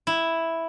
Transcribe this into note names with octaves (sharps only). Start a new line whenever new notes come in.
E4